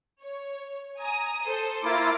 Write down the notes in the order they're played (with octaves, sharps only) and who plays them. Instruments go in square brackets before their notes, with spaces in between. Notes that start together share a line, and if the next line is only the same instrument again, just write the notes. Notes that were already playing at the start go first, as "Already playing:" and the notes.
[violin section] C#5
G#5 A#5 D#6
A4 C5
[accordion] A#3 E4 F4 [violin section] A#5 D6